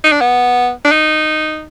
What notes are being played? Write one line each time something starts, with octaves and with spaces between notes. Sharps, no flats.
D#4
D4
B3
D4
D#4